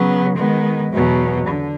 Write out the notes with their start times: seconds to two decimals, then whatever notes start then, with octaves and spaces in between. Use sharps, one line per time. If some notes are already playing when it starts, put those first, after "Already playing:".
Already playing: C#3 F#3 B3
0.37 D#3 G#3 B3
0.92 E2 B2 F#3
1.47 D3